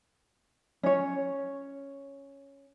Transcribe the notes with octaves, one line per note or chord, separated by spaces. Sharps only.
C#4 C#5